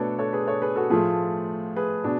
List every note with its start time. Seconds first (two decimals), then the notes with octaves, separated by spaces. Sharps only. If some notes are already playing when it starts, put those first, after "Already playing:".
Already playing: B2 A3 D4 A4 B4 C#5 D5
0.19 A4 C#5
0.33 G#4 B4
0.47 A4 C#5
0.62 G#4 B4
0.76 F#4 A4
0.90 A2 F3 A3 F4 G#4
1.76 G#4 B4
2.04 B2 D4